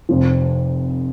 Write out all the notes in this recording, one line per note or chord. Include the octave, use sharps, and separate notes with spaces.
F1 F2 F3